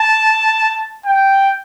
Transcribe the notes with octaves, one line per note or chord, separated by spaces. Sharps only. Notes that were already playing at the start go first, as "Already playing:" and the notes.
Already playing: A5
G5